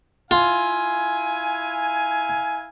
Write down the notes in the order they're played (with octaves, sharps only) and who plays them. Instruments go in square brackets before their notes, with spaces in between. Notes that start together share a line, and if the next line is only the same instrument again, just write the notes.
[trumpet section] E4 F5 G#5 [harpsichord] F4